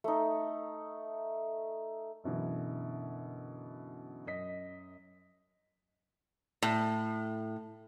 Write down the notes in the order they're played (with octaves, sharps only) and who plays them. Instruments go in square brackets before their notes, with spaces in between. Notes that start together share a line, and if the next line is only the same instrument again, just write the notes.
[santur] A3 D#4
[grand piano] F#2 B2 D3 E3
F#2 D#5 B6
[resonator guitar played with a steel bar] A2